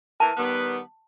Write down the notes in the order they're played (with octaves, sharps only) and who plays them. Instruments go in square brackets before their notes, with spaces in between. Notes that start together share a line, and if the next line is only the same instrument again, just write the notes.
[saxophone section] E3 A#4 [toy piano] A5
[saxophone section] D#3 G3 B3